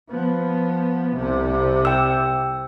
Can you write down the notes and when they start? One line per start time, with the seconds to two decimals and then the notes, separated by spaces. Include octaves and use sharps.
0.10 F3 B3
1.16 C2 C3
1.85 G5 E6